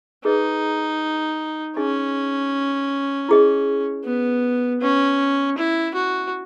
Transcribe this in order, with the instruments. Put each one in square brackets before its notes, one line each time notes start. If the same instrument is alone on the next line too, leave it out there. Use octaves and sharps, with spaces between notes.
[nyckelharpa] D#4 [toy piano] G#4 B4 D#5
[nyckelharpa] C#4 [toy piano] D#4 G#4 D#5 G#5
[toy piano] E4 G#4 D#5
[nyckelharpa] B3
[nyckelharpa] C#4 [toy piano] B4 F#5 C#6
[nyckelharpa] E4
F#4